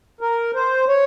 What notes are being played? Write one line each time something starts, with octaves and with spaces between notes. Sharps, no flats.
A#4
C5
C#5